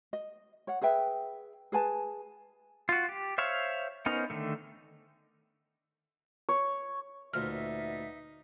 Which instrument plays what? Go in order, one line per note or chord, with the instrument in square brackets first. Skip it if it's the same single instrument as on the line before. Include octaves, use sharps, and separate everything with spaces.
[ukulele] D#5
C#5 F#5
G#4 B4 E5 G5
G#4 B4 G#5 A5
[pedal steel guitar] F4 F#4
G4
C5 C#5 E5 F5 C#6
B3 C#4 D#4 A#4 C5
D3 D#3 A3
[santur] C#5
[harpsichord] D2 A#2 C5 [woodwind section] B3 D5 E5 [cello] D#4 [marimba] F6